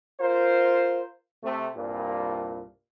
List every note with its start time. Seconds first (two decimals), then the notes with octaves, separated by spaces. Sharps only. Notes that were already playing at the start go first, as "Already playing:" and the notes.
0.20 F4 A#4 C5
1.43 C3 A3
1.76 C2 G2 A#2